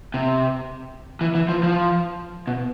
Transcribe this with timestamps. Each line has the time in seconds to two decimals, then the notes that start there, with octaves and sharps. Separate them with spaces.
0.14 C3
1.21 E3
1.35 E3
1.49 F3
1.63 F3
2.47 B2